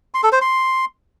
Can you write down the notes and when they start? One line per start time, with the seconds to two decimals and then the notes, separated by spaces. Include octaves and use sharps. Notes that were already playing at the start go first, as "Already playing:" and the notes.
0.14 C6
0.23 A4
0.32 C5
0.41 C6